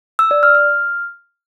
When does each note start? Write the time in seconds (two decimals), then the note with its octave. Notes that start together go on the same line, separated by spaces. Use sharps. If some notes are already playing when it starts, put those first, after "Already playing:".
0.19 E6
0.31 D5
0.43 F6
0.55 F6